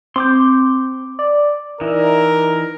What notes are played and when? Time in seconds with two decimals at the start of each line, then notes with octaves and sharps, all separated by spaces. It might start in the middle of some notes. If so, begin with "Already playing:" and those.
0.16 C4 C6 D6 G6
1.19 D5
1.81 E3 D#4 E4 A#4